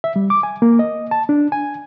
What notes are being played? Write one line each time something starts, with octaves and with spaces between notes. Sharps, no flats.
E5
G3
D6
G#5
A#3
D#5
A5
D4
G#5